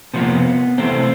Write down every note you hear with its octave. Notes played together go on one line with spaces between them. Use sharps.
C3 F3 A#3 B3
C3 E3 A3 C4